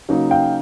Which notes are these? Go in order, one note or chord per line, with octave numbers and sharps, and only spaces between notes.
C#3 F#3 A#3 D#4
F5 G5